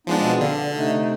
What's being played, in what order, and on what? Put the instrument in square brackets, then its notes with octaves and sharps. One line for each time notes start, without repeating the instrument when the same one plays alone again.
[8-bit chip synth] F3 G#3 D4 [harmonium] B3 D#4
[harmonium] B2 B3 C4
[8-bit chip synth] D3 [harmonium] D5 F5
[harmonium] D4
C3 A3 D#4